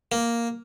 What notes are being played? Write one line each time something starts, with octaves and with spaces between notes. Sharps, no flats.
A#3